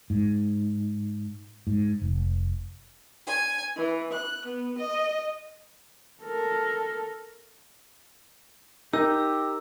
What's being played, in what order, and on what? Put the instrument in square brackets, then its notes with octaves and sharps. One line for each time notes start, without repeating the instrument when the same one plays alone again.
[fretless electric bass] G#2
G#2
F1
[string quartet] G#5
E3
F#6
B3
D#5
[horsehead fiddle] A4 A#4
[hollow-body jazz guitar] D#4 [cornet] G4 [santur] A#4 [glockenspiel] E6